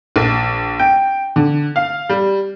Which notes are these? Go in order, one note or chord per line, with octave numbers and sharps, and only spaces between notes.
A#1
G5
D3
F5
G3